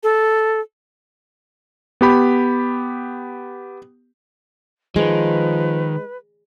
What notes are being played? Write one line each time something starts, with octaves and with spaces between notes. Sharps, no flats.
A4
B3 G4 B5
D#3 F3 G#3 B4